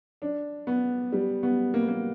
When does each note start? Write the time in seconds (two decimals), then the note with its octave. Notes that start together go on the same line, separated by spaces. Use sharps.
0.22 D4
0.67 B3
1.12 G3
1.43 B3
1.74 A#3
1.82 B3
1.88 A#3